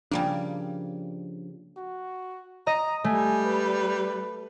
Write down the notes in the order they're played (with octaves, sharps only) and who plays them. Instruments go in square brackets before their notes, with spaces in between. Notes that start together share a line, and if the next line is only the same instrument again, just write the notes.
[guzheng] C#3 G3 A#3 [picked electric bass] F3 D4
[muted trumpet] F#4
[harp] D#5 [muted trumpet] A#5
[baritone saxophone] G3 [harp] A3 [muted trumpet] G#5
[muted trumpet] B4